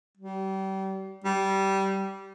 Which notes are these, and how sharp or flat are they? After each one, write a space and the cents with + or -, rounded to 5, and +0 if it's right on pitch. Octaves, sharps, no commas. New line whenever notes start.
G3 -30
G3 -15